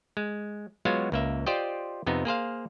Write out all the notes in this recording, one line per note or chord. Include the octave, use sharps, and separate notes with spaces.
G#3
F#3 G#3 B3 F4 F#4 F5
C#2 A#3 E5
F4 G4 C5 D5 D#5 G5
F2 C3 B3 D#4
A#3 G#4 C5 F5